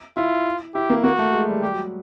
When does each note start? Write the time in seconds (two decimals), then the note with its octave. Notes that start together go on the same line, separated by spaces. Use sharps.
0.17 E4 F4
0.74 E4 G4
0.90 A#3
1.04 A#3 F#4
1.19 A3
1.33 G#3
1.48 G3
1.62 G3 G4
1.72 F#3